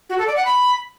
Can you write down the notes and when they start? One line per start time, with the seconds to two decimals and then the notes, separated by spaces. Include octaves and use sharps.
0.10 F#4
0.18 A4
0.27 D5
0.36 F#5
0.45 B5